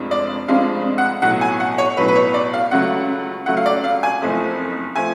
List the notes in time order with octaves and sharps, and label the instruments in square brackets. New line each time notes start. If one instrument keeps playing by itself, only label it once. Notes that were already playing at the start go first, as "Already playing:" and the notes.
Already playing: [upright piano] F1 F2 F3 G#3 D4
D5
F1 F2 F3 G#3 D4 F5
F#5
B1 A2 F#3 F#5
G#5
F#5
C#5
B1 A2 F#3 B4
B4
C#5
D5
F5
C#2 C#3 F#3 A3 F#5
C#2 C#3 F#3 A3 F#5
F5
D5
F5
G#5
F#1 F2 F3 A3
F3 A3 G#5